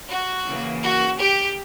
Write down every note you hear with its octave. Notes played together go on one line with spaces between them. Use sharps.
F#4
C#3 E3 A#3
F#4
G4